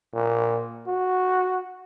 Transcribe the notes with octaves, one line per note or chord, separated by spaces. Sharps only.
A#2
F#4